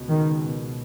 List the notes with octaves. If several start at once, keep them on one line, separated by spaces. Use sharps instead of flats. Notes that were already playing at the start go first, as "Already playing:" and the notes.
Already playing: C#2 B2
D#3